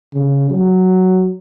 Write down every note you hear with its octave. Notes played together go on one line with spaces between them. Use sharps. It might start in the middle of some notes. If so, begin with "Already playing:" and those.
C#3
F#3